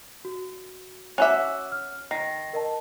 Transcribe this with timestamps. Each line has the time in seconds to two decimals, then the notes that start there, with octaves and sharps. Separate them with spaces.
0.25 F#4
1.18 C#4 F#4 E5 D6 F#6
1.72 F6
2.11 D#3 A#6 C7
2.53 A#4 D#5 A5